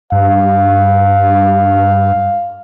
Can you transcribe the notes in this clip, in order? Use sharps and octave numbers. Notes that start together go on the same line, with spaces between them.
G2 F5